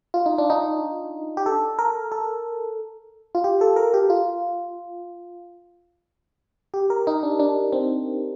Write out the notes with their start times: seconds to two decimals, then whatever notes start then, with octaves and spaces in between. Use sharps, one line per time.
0.14 F4
0.26 D#4
0.38 D4
0.50 D#4
1.37 G4
1.46 A4
1.79 A#4
2.12 A4
3.35 F4
3.44 G4
3.61 A4
3.76 A#4
3.94 G4
4.10 F4
6.74 G4
6.90 A#4
7.07 D#4
7.23 D4
7.39 D4
7.73 C4